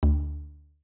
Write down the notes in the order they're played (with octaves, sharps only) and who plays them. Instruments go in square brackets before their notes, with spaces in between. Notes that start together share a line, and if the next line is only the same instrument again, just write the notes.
[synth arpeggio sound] D2